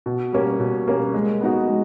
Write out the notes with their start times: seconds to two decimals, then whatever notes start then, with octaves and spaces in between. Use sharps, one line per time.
0.06 B2
0.33 G3 A#3 C#4
0.60 B2
0.88 G3 A#3 C#4
1.14 G#3
1.41 B3 D#4 F#4
1.68 G#3